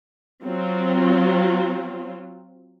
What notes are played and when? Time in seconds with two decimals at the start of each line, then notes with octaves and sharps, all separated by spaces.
0.45 F#3 C4 F4